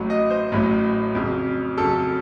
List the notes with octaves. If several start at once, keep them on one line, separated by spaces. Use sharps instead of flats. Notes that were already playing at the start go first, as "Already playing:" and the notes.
Already playing: A1 A2 F#3
D#5
C5
A1 A2 F#3
F2 C#3 F#3
F2 C#3 F#3 A4